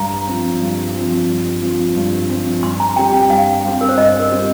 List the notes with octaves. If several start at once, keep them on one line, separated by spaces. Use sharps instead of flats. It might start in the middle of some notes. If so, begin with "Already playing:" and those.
Already playing: G2 A#5
F3 C4
G2
F3 C4
G2
F3 C4
G2
F3 C4
G2 C6
A#5
G3 C4 G4 G5
G5
G2 F5
G3 C4 G4
A#4
C5
G2 D#5
A#4
G3 C4 G4